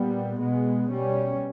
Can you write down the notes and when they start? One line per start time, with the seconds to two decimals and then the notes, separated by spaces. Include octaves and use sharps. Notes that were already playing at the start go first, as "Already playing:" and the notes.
Already playing: A#2 G3 B3
0.39 B2 G#3 B3
0.89 B2 G3 C#4